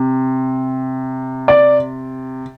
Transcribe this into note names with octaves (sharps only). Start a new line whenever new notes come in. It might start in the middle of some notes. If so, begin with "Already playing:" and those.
Already playing: C3
D5